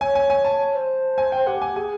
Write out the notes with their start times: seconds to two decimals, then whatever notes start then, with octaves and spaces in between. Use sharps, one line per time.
0.01 C#5 G#5
0.15 G#5
0.30 G#5
0.45 A5
0.59 C#5
0.73 C5
1.18 G#5
1.32 G5
1.47 G4 F#5
1.62 G#5
1.76 G#4 G#5